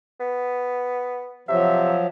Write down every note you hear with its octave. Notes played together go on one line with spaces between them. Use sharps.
B3
C3 F3 F#3 E5